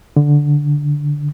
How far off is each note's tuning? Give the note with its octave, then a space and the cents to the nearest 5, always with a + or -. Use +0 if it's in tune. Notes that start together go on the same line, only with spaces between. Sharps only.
D3 -5